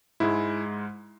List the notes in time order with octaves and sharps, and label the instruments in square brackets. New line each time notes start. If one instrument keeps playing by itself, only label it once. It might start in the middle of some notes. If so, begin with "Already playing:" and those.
[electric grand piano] G#2 G#3 E4